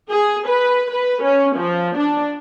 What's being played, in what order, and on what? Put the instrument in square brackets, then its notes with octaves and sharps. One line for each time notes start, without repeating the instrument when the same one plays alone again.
[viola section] G#4
B4
B4
C#4
F3
D4